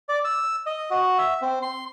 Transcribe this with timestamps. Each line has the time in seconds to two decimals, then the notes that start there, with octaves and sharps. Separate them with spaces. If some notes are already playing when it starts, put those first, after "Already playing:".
0.09 D5
0.25 E6
0.66 D#5
0.90 F#4
1.18 E5
1.42 C4
1.63 C6